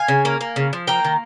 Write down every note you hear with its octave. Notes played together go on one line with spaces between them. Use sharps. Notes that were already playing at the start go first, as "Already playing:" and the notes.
Already playing: F5 G#5
C#3
A#3
A#3
C#3
F3
A#3 G5 A#5
D#3